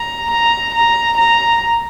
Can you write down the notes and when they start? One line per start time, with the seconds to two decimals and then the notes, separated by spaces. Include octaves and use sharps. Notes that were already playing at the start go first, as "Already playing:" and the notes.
Already playing: A#5
0.31 A#5
0.74 A#5
1.17 A#5